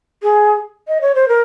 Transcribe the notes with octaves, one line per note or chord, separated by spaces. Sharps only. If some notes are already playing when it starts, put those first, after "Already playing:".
G#4
D#5
C#5
C5
A#4